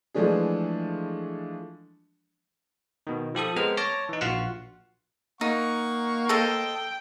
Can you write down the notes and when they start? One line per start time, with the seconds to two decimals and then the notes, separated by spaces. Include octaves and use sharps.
0.14 E3 F3 G#3 A3 D4 G#4
3.07 B2 D#3
3.35 F3 G4 A4 D#6
3.56 G#3 B3 C4 A#4 C5 F6
3.77 C#5 A5 D6 A#6
4.09 E3 D#4
4.21 A#1 F4 F#4 F5 F#5
5.41 A#3 D#4 F#5 C#6
6.29 A4 C5 D#5 G5